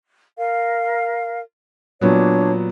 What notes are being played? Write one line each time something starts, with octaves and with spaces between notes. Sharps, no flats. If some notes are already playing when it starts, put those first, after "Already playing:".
A#4 F5
A#2 F#3 B3 D4 C#5